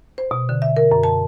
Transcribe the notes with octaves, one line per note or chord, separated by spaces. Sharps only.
C5
B2
D3
E5
A#4
F#2
A5